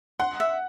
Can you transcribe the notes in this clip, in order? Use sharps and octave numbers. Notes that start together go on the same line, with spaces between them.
F#5 C6
E5